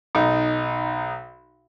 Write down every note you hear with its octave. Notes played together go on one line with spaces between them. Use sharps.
B1 D#4